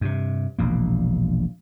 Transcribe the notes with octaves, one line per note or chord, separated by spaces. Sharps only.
G2 C3
E1 A#1 A#3